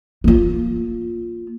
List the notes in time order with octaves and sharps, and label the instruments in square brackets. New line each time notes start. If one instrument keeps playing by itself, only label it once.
[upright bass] A#3 F4